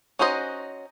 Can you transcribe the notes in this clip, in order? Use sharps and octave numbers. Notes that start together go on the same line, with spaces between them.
C#4 D#4 F#4 C5 D#5